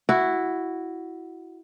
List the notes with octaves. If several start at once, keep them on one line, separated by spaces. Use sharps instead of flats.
E4 F#4